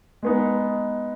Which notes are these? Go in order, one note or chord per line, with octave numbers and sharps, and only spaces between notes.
G#3 B3 D#4